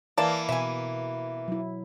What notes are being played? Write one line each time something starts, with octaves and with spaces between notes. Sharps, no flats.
E3 A#3 D5 A5
B2 E5 G#5
F#3 E4